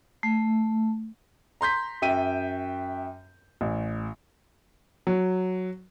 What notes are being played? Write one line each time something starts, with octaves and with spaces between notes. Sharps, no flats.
A3
A#5 C6 G6 B6
F#2 E5 G5 D#7
A1
F#3